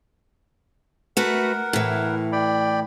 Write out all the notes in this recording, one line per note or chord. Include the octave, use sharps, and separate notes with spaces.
A3 F#4 A#4 B4 F#5
A2 E3
D5 G5 B5